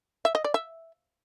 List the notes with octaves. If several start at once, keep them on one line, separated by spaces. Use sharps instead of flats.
E5
D#5
D5
E5